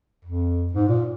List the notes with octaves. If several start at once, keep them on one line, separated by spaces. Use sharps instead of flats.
F2
G#2
A#2